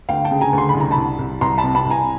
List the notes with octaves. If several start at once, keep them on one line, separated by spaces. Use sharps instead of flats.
D2 F5 G5
G5 A5
C#3
G#5 A#5
D2
C6
B5
C2
A#5
A5 B5
C2
C2
C2 A#5 C6
A5 B5
C3
A5 B5
C2
G#5 A#5